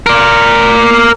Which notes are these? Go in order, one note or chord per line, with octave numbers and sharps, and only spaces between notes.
A#4 D5